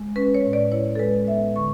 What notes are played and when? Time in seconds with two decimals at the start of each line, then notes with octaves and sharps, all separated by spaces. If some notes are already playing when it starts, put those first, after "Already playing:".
Already playing: G#3
0.16 C#4 B4
0.34 C#5
0.44 A2
0.53 D5
0.72 E4 C#5
0.95 A4
0.99 G#3 B4
1.27 B3 E5
1.56 D3 C#6